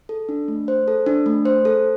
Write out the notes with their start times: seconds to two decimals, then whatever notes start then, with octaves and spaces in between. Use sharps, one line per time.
0.09 A4
0.29 D4
0.48 A3
0.68 C5
0.88 A4
1.06 D4
1.26 A3
1.45 C5
1.65 A4